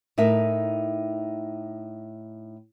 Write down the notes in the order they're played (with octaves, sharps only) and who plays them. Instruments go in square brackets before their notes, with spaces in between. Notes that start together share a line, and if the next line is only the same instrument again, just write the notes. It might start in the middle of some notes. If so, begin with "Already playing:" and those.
[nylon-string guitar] A2 D#4 A#4 E5